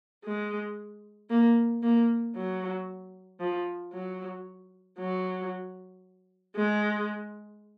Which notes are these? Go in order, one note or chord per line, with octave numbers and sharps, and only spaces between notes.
G#3
A#3
A#3
F#3
F3
F#3
F#3
G#3